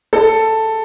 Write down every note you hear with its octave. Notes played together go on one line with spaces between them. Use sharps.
A4